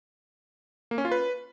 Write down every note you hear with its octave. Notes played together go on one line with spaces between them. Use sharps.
A#3
C#4
F4
B4